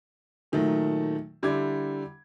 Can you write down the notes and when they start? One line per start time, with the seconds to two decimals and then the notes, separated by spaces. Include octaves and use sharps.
0.52 A#2 D#3 F#3 A3
1.43 D3 G3 E4 D6 G#6